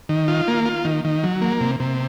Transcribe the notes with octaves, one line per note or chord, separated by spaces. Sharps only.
D#3
F4
A#3
F4
D#3
D#3
F#3
A#3
C3
C3